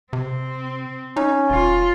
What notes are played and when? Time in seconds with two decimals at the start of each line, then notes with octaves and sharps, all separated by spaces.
0.13 C3 C4
1.17 C#4 D#4
1.50 E1 F4